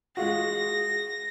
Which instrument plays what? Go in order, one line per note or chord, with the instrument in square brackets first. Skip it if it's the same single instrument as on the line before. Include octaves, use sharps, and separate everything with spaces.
[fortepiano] G#3 F4 F#4 [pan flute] G#4 [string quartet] A#6